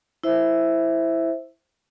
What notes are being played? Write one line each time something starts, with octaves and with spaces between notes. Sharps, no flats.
E4 C5 E5